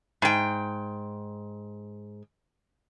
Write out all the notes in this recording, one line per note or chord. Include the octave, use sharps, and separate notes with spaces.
G#2 G5